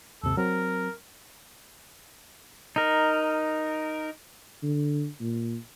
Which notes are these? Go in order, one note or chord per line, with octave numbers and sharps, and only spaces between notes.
D#2 G#2 C3 A4
F#3 C4 A#4
D#4 A#4
D3
A#2